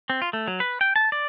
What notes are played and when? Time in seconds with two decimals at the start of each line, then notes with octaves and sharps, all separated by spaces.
0.10 C4
0.22 F4
0.33 A3
0.48 F#3
0.60 B4
0.81 G5
0.96 A5
1.12 D5